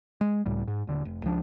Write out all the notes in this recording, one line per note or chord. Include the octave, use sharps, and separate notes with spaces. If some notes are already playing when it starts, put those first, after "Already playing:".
G#3
C#2 A2 G3
G#2
D#1 D3
F1
C#2 F3 D4